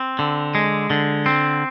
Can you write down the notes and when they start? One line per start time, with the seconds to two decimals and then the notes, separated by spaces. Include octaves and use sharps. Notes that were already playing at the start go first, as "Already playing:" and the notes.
Already playing: C4
0.19 D3
0.55 G#3
0.90 D3
1.26 C4